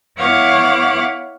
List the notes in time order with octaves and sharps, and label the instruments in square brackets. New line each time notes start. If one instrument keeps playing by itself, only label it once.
[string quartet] B3 E4 C#5 F5 F#5 D6